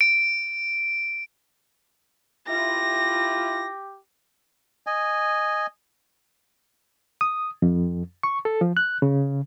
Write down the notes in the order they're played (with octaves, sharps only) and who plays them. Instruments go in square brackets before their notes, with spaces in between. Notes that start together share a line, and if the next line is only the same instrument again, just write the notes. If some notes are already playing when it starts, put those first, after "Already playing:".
[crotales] D7
[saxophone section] E4 F4 [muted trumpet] G4 [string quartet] A#6
[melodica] D#5 G#5
[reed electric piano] D#6
F2
C#6
A4
F3
F#6
C#3